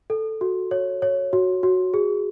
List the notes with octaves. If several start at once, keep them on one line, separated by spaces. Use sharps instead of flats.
A4
F#4
C#5
C#5
F#4
F#4
G#4